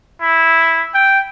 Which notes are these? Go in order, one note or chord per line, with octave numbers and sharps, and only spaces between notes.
E4
G5